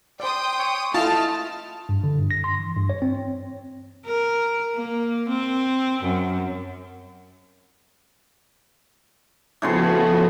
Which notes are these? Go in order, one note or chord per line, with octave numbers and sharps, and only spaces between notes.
C5 D5 G5 C6 D#6
C#5
A3 E4 F4 D#5 A5 F6
G2
D3
G2
A#6
C6
E3
G2
C#5
C4
A#4
A#3
C4
F#2
A2 C#3 F3 B3 F#4 C6